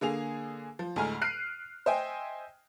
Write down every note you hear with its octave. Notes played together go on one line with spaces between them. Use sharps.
D3 A#3 G#4 F7
F3
D2 A2 G#3 G#5 A#5 F6
F6 F#6 C7 D7 D#7
C5 D#5 E5 G5 G#5